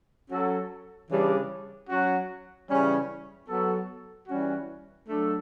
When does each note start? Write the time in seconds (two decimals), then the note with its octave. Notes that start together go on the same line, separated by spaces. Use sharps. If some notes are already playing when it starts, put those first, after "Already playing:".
0.31 F#3 C#4 F#4 A4
1.10 C#3 E3 G3 D4
1.90 F#3 C#4 F#4
2.69 C#3 E3 G3 C#4
3.49 F#3 B3 F#4 A4
4.28 E3 G3 C#4 F#4
5.08 F#3 A3 D4 A4